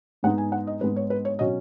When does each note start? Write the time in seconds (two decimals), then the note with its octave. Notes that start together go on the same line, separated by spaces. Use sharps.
0.23 G#2 G#3 B3 D#4 F#5
0.38 G#5
0.52 F#5
0.67 D#5
0.81 G#2 G#3 B3 D#4 B4
0.96 C#5
1.10 B4
1.25 C#5
1.39 B2 F#3 C#4 D#5